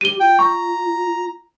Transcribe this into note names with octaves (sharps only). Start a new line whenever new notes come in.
G4 D#7 G7
F4 G5
A#5 C#6